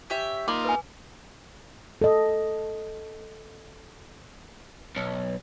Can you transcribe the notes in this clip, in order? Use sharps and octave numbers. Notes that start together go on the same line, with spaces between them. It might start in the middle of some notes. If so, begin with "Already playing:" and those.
C#4 G4 E5
A#3 D#4 F4 B5 C6 D6
B4 G#5
A4 D#5
B1